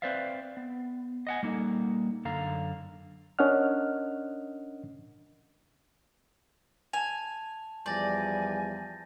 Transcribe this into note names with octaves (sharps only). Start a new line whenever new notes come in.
C4 B4 C5 D5 E5 F5
B3
D#5 F#5 G#5
G3 A#3 D#4 A4
F#2 D3 A4 F5 A#5
C#4 D4 A#4 D#5 F#5 F6
G#5 A5 F7
E2 F3 G3 D5 G#5 G6 A6 A#6